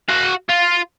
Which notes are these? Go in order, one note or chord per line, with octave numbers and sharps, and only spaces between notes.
F#4 F5
F4